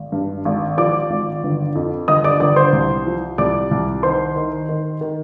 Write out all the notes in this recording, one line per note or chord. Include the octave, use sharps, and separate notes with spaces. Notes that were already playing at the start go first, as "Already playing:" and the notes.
Already playing: G#1
G2
G#1
F3 D5 D6
G#1
G1
F2
G1 D#5 D#6
D5 D6
G1 D5 D6
C5 C6
C2
F3
C2 D5 D6
C2
D#3 C5 C6
D#3
D#3
D#3